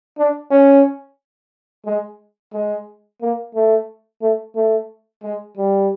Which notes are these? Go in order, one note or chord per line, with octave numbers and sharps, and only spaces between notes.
D4
C#4
G#3
G#3
A#3
A3
A3
A3
G#3
G3